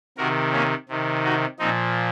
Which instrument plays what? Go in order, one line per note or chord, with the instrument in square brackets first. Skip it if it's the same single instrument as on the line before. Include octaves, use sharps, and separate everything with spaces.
[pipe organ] C3 D#3 F#4 A#4
A#3 C#4
C3 D#3
D#4 F#4
A#2 F3 C4 D#4